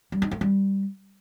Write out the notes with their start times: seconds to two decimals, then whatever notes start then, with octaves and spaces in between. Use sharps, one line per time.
0.12 G3
0.22 D#4
0.31 A3
0.41 G3